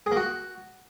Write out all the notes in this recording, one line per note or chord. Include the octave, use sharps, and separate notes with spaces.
G#4
A#3
F#4